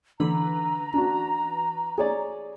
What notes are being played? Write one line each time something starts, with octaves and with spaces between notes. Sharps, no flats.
D3 E3 B4 A#5
D4 F#4
G#4 C#5 D5